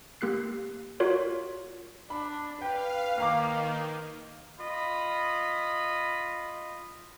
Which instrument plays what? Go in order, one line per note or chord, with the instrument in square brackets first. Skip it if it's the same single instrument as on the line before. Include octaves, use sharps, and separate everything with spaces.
[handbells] A#3 G4 F#6 C7
F4 F#4 A#4 C#5
[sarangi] D4 [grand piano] B5
[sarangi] B4 [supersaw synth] F5 [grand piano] G5
[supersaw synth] D#3 [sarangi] A#3 [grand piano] F5 A#5 D6
[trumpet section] F4 D#5 B5